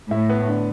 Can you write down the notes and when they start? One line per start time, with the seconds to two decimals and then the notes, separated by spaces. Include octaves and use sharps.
0.11 A2 E4
0.29 B3
0.47 D3